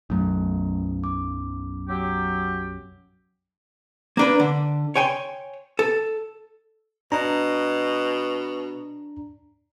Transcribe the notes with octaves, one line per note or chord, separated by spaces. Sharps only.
B1 F#2 A3 C#4
D6
F#3 G4
A#3 D4 B4
D3
C#5 G5 G#5 C6
A4
B2 D4 A#5